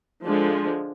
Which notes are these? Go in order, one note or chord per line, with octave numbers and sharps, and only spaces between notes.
D3 F3 G#3